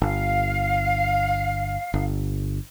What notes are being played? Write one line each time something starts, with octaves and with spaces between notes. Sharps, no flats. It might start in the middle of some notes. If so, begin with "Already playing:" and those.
G1 F5
G1